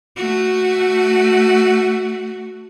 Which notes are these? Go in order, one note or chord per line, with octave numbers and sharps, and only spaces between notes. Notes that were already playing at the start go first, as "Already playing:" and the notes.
A3 F#4